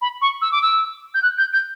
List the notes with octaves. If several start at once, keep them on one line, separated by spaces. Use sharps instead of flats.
B5
C#6
E6
D6
E6
G6
F#6
G6
G6